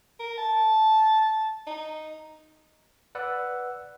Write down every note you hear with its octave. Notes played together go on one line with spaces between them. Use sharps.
A#4
A5
D#4
B4 D5 F#5 E6